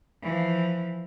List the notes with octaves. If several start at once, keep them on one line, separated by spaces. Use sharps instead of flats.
E3 F3